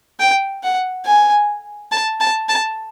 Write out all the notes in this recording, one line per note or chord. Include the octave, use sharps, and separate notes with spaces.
G5
F#5
G#5
A5
A5
A5